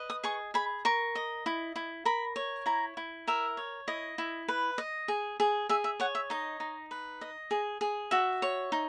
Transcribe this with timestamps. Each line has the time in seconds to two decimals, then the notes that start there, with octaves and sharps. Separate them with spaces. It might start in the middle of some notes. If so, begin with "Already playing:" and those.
Already playing: B4 D#5
0.10 D#6
0.24 G#4 C#6
0.54 G#4 B5
0.85 A#4 C#6
1.15 D#5
1.46 E4
1.76 E4
2.05 A#4 B5
2.36 C#5
2.66 E4 A#5
2.97 E4
3.27 A#4 E5
3.57 C#5
3.88 E4 D#5
4.18 E4
4.48 B4
4.78 D#5
5.08 G#4
5.40 G#4
5.69 G#4 E5
5.84 E5
6.00 C#5 F#5
6.15 E5
6.30 D#4 D#5
6.60 D#4
6.91 B4
7.21 D#5
7.51 G#4
7.81 G#4
8.11 F#4 E5
8.42 C#5
8.72 D#4